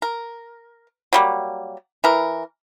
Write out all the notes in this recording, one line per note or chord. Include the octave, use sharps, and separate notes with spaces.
A#4
F#3 G3 A#3
E3 A#4